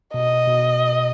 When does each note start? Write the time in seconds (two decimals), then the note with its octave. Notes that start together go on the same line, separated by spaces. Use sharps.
0.14 B2 D#5
0.47 B2